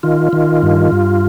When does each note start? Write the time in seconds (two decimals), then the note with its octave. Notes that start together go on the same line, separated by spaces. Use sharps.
0.03 D#3 F4
0.33 D#3
0.63 G2
0.92 G2